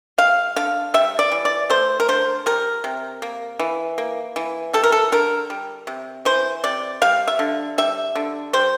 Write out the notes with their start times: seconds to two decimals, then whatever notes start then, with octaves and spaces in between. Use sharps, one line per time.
0.18 G3 F5
0.56 D3 F5
0.94 G3 E5
1.19 D5
1.32 E3
1.45 D5
1.70 A3 C5
2.00 A#4
2.08 D3 C5
2.46 G3 A#4
2.84 C3
3.22 A#3
3.59 E3
3.98 A#3
4.36 E3
4.73 G3 A4
4.83 A#4
4.92 A4
5.12 D3 A#4
5.50 G3
5.87 C3
6.25 E3 C5
6.64 C3 D5
7.02 G3 F5
7.27 E5
7.39 D3
7.78 G3 E5
8.15 D3
8.53 G3 C5